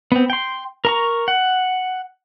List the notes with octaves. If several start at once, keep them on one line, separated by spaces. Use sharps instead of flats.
B3 C4
G5 C6
A#4 A#5 C#6
F#5